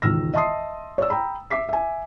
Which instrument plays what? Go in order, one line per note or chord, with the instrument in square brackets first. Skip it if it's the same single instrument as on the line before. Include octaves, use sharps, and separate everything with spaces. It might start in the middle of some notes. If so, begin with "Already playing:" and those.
[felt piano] E1 C#2 D#3 E6 F6 A#6
D#5 E5 A5 C6 D#6 C7
C#5 D5 E6
G5 A#5 B5
E5 D6 B6 C7
E5 G#5